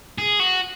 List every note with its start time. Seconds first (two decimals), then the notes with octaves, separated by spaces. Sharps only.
0.18 G#4
0.40 F#4